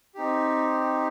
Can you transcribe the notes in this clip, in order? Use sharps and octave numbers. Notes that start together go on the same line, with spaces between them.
C4 D#4 G4